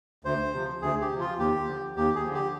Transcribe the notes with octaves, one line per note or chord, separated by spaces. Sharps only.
D2 C5
C3 F3
D2 G#4
G4
C3 F3
F4
D#2 G4
D3 F3
D#2 G4
G#4
D3 F3
G4